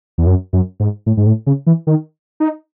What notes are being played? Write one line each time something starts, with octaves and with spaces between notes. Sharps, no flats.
E2
F#2
F#2
G#2
A2
G#2
A2
C#3
E3
D#3
D#4